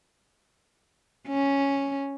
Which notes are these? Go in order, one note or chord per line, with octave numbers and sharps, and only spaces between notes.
C#4